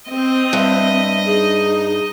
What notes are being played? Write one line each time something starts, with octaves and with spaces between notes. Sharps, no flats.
C4 D#5
G2 E5
D#4 G#4